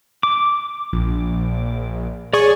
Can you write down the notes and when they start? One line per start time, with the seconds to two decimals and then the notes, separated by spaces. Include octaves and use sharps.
0.23 D6
0.93 A#1
2.33 G#4 C#5 D5 G#5 C#6